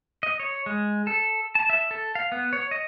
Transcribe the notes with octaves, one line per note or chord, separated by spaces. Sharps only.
D#5
C#5
G#3
A4
A5
E5
A4
F5
B3
C#5
D#5